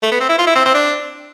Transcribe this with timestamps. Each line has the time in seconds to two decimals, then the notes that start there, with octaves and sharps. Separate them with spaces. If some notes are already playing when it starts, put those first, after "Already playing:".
0.03 A3
0.12 B3
0.20 C4
0.29 E4
0.38 F4
0.47 E4
0.55 C4
0.65 C4
0.74 D4